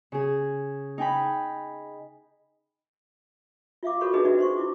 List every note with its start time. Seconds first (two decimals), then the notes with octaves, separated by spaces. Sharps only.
0.12 C#3 G#4
0.98 D#4 G5 G#5 B5
3.83 F4 E5 F5 D6
4.01 F#4 A4 A#4 C#5 B5 C#6
4.13 D4 D#4 F#4 G#4 B4 D#5
4.25 C#4 D4 F#4 D5 E5
4.39 C5 C6 C#6
4.57 E4 F4 D6